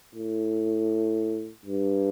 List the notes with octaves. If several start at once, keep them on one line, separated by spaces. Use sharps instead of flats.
A2
G2